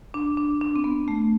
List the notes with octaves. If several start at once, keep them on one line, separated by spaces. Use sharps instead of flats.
D4
D4
D4
C4
B3
A3